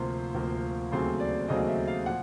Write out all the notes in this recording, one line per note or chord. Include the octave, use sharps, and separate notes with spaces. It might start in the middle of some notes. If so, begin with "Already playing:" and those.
Already playing: D2 C3 F3 A#3 C5
D2 C3 F3 A#3
D#2 C#3 F#3 A3 C4 C5
D5
D#2 C#3 F#3 A3 C4 D#5
E5
F5
A#2 F3 F#5